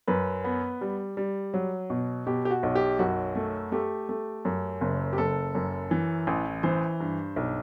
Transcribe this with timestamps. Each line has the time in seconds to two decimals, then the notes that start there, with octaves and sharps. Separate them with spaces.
0.08 F#2 B4
0.44 B3
0.81 G3
1.17 G3
1.54 F#3
1.90 B2
2.27 B2 G4
2.45 G4
2.51 F#4
2.63 B1
2.75 G4
2.99 F#2 F#4
3.35 A3
3.72 A3 G4
4.09 A3
4.45 F#2
4.81 F#1
5.13 G4
5.18 F#1 A4
5.55 F#2
5.91 E3
6.27 A1
6.63 E3 C5
7.00 G2
7.36 B1